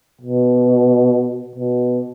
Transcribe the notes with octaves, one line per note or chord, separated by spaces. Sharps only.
B2
B2